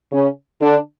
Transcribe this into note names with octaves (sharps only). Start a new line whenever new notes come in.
C#3 C#4
D3 D4